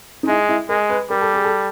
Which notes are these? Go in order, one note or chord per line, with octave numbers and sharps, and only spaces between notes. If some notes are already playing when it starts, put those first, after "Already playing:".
D#4
G#3 E4
E4
G#3 A#4
B4
G3 A#4
A4
G#4
A4